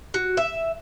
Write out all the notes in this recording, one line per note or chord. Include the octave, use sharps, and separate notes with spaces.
F#4
E5